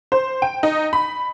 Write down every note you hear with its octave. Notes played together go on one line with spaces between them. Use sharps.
C5
G5
D#4
B5